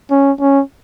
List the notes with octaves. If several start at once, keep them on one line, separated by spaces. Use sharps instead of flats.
C#4
C#4